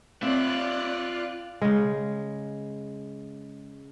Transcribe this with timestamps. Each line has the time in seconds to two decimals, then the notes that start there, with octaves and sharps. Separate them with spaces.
0.23 C4 F4 C#5 D5 E5 F#6
1.62 C#3 G#3